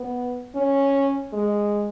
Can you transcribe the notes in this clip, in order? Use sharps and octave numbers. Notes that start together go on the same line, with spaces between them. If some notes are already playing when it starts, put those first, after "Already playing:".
Already playing: B3
C#4
G#3